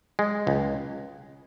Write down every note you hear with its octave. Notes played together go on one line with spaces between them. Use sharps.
G#3
C#2